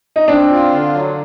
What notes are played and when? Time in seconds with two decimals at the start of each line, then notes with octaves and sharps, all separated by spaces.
0.16 D#4
0.27 C4 D4
0.50 F4
0.71 D3
0.94 F#3